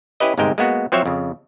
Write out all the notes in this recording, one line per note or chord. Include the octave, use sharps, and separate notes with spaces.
C#4 E4 G4 B4 D#5
G1 G#2 C3 G#3 A#4 G5
G#3 A#3 B3 F#4
F3 F#3 C4 C5 C#5 E5
F2 C#3